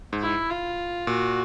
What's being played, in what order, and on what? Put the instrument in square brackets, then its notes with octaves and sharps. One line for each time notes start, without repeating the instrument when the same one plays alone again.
[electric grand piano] G#2
[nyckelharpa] E4
F4
[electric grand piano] A#2 [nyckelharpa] F#4